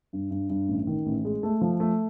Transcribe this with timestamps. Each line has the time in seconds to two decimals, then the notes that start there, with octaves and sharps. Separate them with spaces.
0.13 G2
0.31 G2
0.50 G2
0.68 A1
0.87 D#3
1.06 A1
1.25 G#3
1.43 A3
1.61 F3
1.80 A3